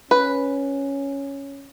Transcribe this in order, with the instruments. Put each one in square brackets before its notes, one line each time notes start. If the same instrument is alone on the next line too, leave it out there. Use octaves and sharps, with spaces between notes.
[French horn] C#4 [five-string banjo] B4